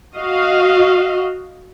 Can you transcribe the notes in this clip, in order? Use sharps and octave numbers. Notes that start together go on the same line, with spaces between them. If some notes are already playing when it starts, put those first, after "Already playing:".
F#4 D#5 F5